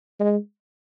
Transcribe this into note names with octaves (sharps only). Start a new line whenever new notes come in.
G#3